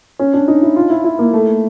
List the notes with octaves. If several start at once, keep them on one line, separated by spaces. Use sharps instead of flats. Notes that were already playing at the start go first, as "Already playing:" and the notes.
C#4
D4
D#4
E4
F4
E4
E4
A#3
A3